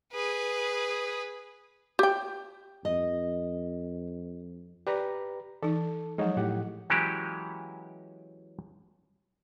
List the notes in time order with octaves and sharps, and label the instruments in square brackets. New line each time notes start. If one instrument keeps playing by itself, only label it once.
[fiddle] G#4 B4
[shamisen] G4 G5
[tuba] F2 [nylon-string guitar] D#5
[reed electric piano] G4 B4 A#5 [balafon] D5
[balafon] E3 D#4 [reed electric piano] A4
[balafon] F3 F#3 [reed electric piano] G#3 D#4 C#5
[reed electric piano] A2 G4 F#5
[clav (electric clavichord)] E3 F#3 G#3 C#4 E4 G4